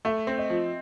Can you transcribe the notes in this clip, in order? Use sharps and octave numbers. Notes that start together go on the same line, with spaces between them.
A3 E5
C4
D#5
F3